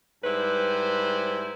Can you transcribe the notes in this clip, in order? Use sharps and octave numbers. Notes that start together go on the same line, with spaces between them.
G#2 G3 E4 B4 C5